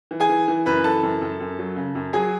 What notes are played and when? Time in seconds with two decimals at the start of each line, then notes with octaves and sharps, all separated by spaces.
0.11 E3
0.20 G#4 G#5
0.29 E3
0.48 E3
0.66 F#2 B4 B5
0.84 E3 A4 A5
1.03 F#2
1.22 F#2
1.40 F#2
1.59 F#3
1.76 C#3
1.95 F#2
2.13 F#3 G#4 G#5